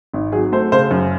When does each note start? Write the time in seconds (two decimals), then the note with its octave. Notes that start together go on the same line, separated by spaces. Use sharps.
0.14 G#1
0.32 F#3 G#4
0.52 A3 C5
0.72 C#3 C5
0.91 F#2